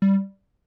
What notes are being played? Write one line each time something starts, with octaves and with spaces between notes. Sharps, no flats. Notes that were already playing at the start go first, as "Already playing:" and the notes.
G3